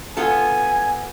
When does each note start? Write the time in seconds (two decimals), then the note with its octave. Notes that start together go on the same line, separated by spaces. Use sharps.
0.17 B3 F4 A4 G#5